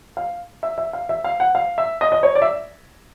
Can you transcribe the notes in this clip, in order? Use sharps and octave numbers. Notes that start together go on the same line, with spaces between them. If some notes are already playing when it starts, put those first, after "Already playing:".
F5
E5
E5
F5
E5
F5
F#5
F5
E5
D#5
D#5
C#5
D5
E5